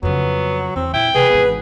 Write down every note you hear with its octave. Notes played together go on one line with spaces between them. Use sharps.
F2 C#3 F#3 B3
E2 C4
A#2 E4 G5
C3 E3 G#4 B4
G#1 E3 B3